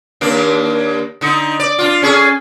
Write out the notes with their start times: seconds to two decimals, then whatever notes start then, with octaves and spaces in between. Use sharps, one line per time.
0.21 D#2 A#3 D4
1.21 D3 D#4
1.60 D5
1.79 D4 F4
2.02 C#4 G#4 A4